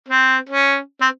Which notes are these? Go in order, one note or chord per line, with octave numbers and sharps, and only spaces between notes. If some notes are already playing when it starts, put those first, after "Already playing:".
C4
C#4
C4